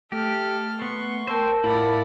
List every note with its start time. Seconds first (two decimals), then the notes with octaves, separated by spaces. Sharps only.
0.12 A3 G4 A4 F6
0.82 B3 C6 C#6
1.27 A#4 C5 G5 A5 E6
1.64 A2 E4 F4 D5 F#5 B5